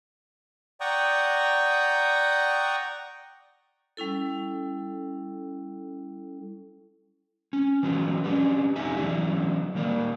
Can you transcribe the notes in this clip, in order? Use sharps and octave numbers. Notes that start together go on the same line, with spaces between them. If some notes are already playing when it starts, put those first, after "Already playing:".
D5 F#5 G5 A#5 C#6 D#6
G3 C#4 E4 A4
C#4
E3 F#3 G#3 B3 C#4 F4
C#4 D4 G4 B4
F2 D#4 G4 E5 G#5
E3 F#3 B3 C#4 D4 E4
D#3 A#3 A#4 D5